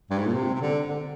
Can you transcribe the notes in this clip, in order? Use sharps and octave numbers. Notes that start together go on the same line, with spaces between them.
G2
G#2
A#2
C3
C3
D3
D3